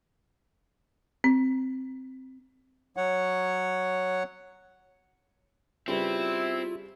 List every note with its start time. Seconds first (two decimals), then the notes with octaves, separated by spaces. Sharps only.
1.24 C4
2.97 F#3 C#5 F#5
5.88 C#3 G3 C4 E4 F4 B4